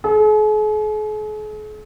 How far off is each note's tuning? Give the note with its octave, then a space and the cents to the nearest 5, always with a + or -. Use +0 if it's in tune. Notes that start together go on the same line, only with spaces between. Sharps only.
G#4 +45